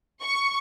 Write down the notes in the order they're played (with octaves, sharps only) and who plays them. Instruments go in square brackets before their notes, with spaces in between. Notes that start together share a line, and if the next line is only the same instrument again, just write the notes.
[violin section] C#6